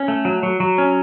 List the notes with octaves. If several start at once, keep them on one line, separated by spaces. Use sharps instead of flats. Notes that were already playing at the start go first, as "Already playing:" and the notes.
Already playing: C#4
A3
F#3
F#3
F#3
C#4